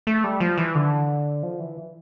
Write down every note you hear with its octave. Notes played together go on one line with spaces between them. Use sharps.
A3
G3
F3
E3
D3
F3
E3